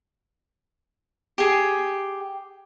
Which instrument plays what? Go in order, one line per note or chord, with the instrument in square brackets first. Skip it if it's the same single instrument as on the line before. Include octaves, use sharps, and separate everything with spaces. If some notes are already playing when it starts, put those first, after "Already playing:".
[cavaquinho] G4 G#4